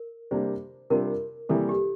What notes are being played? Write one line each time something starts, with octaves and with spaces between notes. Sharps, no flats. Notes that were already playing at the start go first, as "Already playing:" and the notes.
Already playing: A#4
C3 G3 A#3 D4 G4 C5
C3 G3 D4 F4 A#4
C3 E3 G3 A#3 A4
G4